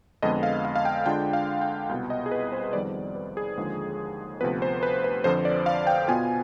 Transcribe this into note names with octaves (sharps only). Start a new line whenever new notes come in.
F2 D3 G#3 B3 D#5
F5
F5
F5
G5
D3 G#3 D4 F4 G5
F5
G5
C2 B2 B3 G5
D#5
G#4
B4
C5
F2 D#3 G3 B3 D5
B4
G#4
D#2 D3 F3 G#3
D2 C3 F3 B3 B4
C5
B4
B4
F2 D3 F3 C5
D5
F5
G5
B2 B3 F4 G#5